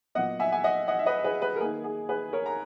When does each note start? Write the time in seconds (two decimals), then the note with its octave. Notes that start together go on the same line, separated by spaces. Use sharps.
0.15 A#2 F#3 B3 D#5 F#5
0.40 E5 G#5
0.52 G#5
0.64 D#5 F#5
0.88 D#5 F#5
0.99 E5
1.06 B4 D#5
1.24 G#4 B4
1.42 G#4 B4
1.56 A#4
1.60 D#3 A#3 G#4
1.84 G#4
2.09 G#4 B4
2.33 A#4 C#5
2.46 A#5